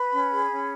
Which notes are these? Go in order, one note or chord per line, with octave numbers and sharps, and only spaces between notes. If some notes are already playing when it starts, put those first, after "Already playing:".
Already playing: B4 B5
C#4
G#4
C#4